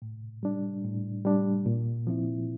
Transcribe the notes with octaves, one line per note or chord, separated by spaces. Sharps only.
A2
G3 D4
A2
G3 D4
A#2
F3 C4 E4